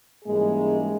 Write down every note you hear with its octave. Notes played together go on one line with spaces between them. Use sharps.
G#2 E3 G3 G#3 A#3 C#4 G#4